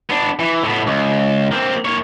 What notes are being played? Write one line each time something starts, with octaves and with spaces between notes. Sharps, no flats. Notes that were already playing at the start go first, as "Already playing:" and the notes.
B3 D4
E3
A2 B3
C#2
A#3 C4
A#3 C#5